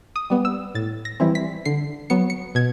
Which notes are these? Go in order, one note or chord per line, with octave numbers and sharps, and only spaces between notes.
D#6
G3 B3
E6
A2 A6
A#6
E3 G3 C4 E4
B6
D3 C7
F#3 B3 C#7
C#7
B2 G#6